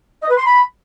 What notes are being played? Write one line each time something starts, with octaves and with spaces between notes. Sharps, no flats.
D#5
B4
C6
B5